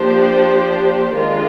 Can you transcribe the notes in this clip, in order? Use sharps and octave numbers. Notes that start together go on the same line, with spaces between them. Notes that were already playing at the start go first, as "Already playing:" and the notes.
Already playing: F3 A#3 D4 G4 C5
D#3 G#3 D4 F4 A#4